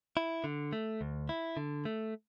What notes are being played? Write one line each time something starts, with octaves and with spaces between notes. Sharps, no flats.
E4
D3
A3
D2
E4
D3
A3